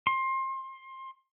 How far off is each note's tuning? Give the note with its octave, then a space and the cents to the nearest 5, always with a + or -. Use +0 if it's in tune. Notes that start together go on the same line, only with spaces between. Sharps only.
C6 +25